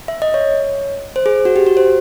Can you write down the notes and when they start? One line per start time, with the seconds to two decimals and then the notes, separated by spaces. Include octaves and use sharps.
0.08 E5
0.22 D#5
0.34 C#5
1.16 C5
1.26 G#4
1.45 F#4
1.56 G4
1.66 F#4
1.77 C5